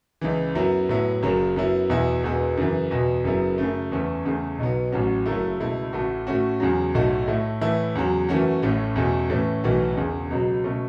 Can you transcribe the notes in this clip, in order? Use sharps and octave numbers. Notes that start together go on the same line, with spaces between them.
C#2 C#3 E3
F#2 F#3 B3 E4
A2 F#3 B3 E4
F#1 F#2 F#3
F#2 F#3 B3 E4
E2 B2 B3 E4
E1 E2 B2 B3
F#2 C#3 E3
E2 B2 B3
F#1 F#2 F#3 B3 E4
F#2 C#3 A3
E2 E3 A3 C#4
E2 C#3 A3
B1 B2 F#3 B3
A1 A2 F#3 C#4 F#4
F#1 F#2 F#3 A3 E4
C#2 B2 A3 E4
A1 A2 A3 F#4
A2 A3 C#4 F#4
E2 C#3 F#3
B1 A2 A3 F#4
A2 A3 E4
A2 E3 A3 E4
E2 C#3 F#3
F#2 E3 A3 C#4 F#4
A1 A2 A3 C#4
E2 B2 A3 C#4
A2 E3 A3 C#4
B1 A2 E3 A3 F#4
E1 E2 C#3
C#2 B2 F#3
B2 A3 C#4